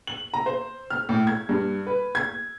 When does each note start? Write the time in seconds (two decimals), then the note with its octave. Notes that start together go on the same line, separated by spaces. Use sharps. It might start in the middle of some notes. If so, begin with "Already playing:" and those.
0.07 F#7
0.34 A#5
0.46 C5
0.90 F6
1.09 A2
1.27 G#6
1.49 G2
1.87 B4
2.15 G#6